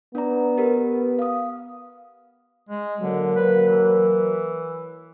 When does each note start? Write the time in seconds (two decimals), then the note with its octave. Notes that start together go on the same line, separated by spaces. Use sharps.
0.15 B3 D4 D5 A#5
0.58 G4 A#4 B4
1.19 F5 D#6
2.69 G#3
3.00 D3 F#3 A#3
3.36 B4
3.68 E3